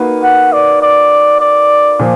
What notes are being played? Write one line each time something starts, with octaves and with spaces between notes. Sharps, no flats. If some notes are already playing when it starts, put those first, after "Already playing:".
Already playing: A#3 D#4 F#4 B4
F#5
D5
D5
D5
A#2 F3